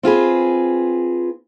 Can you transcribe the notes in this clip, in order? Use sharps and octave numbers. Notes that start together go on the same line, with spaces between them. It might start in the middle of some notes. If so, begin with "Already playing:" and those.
C4 F4 G#4 B4